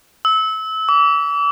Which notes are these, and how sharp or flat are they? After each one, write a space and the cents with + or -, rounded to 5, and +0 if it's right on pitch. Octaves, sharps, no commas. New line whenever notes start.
E6 -25
D6 -40